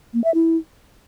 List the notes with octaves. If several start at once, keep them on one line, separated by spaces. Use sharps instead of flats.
A#3
E5
E4